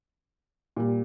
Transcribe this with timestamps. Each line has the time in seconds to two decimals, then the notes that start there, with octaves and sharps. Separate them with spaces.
0.76 A#2 G3